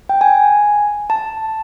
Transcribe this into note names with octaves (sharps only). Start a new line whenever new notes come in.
G5
G#5
A5